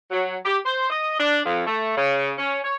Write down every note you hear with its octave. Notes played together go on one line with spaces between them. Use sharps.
F#3
G4
C5
D#5
D4
F2
A3
C#3
C#4
C#5